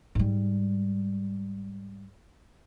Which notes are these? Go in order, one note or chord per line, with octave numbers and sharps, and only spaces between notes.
G#2 G3